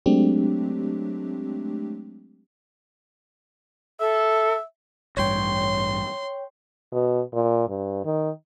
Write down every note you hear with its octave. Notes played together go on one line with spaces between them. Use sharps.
F#3 G#3 A3 C4 D4 G4
A4 E5
A1 G2 C#5 G5 C6
B2
A#2
G2
D#3